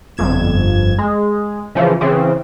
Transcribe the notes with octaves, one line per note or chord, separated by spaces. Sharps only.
G1 F2 G#6 E7
G#3
C#3 E3 F3
C#3 E3 C4